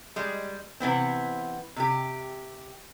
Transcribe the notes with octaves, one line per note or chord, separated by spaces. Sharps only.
G3 G#3
C3 E3 B3 C4
C3 G4